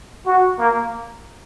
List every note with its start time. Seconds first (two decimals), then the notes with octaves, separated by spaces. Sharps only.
0.27 F#4
0.59 A#3